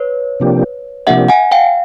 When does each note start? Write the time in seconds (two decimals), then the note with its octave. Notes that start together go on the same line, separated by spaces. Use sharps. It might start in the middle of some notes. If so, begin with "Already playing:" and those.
Already playing: B4 C#5
0.40 C3 F3 A#3 D4 G4
1.07 C3 F3 A#3 D4 G4 E5 F#5
1.28 F#5 G#5
1.51 F5 G5